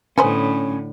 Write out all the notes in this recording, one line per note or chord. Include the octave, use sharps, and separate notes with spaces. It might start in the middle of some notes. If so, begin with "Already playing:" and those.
A2 D3 B3 C#4 C5 G#5 B5 D#6